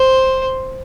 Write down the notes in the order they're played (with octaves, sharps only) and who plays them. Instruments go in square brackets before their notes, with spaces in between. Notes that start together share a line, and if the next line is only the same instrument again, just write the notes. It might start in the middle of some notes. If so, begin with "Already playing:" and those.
Already playing: [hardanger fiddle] C5